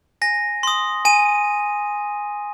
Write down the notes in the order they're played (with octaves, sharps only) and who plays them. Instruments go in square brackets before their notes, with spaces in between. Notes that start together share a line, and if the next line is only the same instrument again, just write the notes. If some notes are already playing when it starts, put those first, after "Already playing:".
[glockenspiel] G#5 A#6
C6 D#6
G#5 D#7